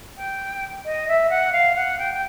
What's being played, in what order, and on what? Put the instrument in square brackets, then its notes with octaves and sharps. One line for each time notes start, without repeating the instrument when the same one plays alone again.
[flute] G5
D#5
E5
F#5
F5
F#5
G5
G5